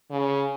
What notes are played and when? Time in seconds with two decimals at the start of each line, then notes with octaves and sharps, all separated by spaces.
0.11 C#3